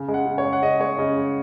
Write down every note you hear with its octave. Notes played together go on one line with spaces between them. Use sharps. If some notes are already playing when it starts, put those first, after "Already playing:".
Already playing: C#3
G#3
F#5
C#3
C#5
G#3
F#5
C#3 D#5
G#3 C#5
C#3 D#5
G#3